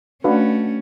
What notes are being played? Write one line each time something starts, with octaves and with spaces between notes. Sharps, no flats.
A3 C#4 D4 F#4 B4 F5